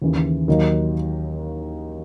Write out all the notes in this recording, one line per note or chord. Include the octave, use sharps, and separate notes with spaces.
D#2 C#3 E3
D#2 D#3 F#3 A#3 D#4